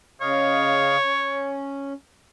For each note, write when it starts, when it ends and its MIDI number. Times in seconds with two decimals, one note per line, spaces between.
0.21 0.96 49
0.21 1.58 73
0.21 0.96 75
0.21 0.96 77
1.04 1.93 61